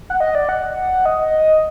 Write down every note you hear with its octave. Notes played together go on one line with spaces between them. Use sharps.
F#5
D#5
D5
F#5
D#5